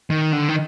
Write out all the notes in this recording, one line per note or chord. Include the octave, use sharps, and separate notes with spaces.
D#3
D3
D#3